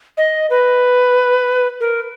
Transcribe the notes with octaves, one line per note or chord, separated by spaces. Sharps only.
D#5
B4
A#4